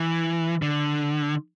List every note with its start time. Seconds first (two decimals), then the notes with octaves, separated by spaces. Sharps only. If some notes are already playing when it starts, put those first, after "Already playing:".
Already playing: E3
0.62 D3